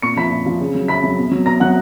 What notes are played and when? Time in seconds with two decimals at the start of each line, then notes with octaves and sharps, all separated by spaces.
0.02 A#2 C#6 C#7
0.16 F3 B5 B6
0.31 A#2
0.46 F3
0.60 C#3
0.75 F#3
0.88 C#3 B5 B6
1.03 F#3
1.18 B2
1.31 F#3
1.46 B2 A#5 A#6
1.60 F#3 F#5 F#6